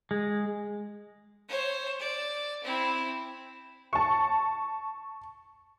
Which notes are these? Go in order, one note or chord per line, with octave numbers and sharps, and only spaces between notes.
G#3
C5 C#5
D5
C4 E4
A5 C#6